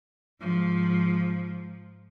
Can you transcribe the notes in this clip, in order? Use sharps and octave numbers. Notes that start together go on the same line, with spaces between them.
G#2 F3